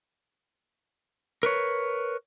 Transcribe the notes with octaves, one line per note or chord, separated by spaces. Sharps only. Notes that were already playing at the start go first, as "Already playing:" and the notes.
A#4 B4 C#5